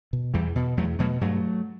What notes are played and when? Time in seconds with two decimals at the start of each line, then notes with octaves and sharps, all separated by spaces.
0.13 B2
0.34 E2 E3 G3
0.56 B2
0.77 E2 F#3 A3
0.99 B2 F#3 A3
1.21 G2 F#3 A3